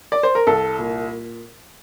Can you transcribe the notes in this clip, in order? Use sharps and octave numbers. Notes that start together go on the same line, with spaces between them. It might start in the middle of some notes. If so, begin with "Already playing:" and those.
D5
C5
A#4
C2 A4
A#2